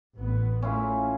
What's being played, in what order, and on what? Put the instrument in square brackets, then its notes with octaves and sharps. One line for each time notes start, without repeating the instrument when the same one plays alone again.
[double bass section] A1 B3
[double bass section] A3 [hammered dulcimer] C#4 E4 F4